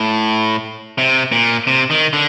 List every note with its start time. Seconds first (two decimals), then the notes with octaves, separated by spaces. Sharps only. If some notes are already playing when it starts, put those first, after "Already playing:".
Already playing: A2
0.98 C3
1.32 A#2
1.67 C3
1.90 D#3
2.13 D3